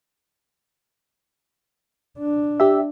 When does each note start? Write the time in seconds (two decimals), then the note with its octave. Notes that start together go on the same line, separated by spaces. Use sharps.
2.19 D4
2.60 G4 E5